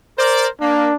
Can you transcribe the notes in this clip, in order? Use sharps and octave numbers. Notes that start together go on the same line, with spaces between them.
A#4 C5 D5
A#3 D4